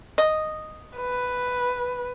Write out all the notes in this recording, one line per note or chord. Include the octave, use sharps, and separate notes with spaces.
D#5
B4